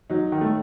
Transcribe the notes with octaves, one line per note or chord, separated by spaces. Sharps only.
F#3 D#4
D#3
A3
A2